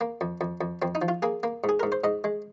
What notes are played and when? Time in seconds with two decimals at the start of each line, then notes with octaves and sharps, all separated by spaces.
0.01 A#3
0.21 F2
0.41 F2
0.61 F2
0.82 F2 C4
0.95 D#4
1.02 F3
1.08 F4
1.22 A#3 G#4
1.43 A#3
1.64 G#2
1.69 G#4
1.80 G#2 A#4
1.92 C5
2.04 G#2 D#5
2.24 G#3